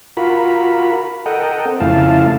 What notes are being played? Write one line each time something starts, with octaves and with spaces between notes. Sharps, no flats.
F4 F#4 A#4 B5
A4 A#4 D#5 F#5 G5
C4
F2 C#3 A3 E4 F5 A5